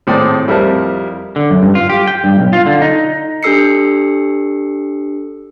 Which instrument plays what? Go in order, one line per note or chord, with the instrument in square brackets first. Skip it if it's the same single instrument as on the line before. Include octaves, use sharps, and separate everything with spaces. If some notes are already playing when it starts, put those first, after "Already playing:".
[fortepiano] G#1 A2 C4 D5 G5 D#6
F2 G3 E4 A#4 C5 A5
[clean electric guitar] D3
F#2
G2
F4
G4
G5
G2
B1
F4
D3
D#4
[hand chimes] D4 G4 A4 E6 C7 C#7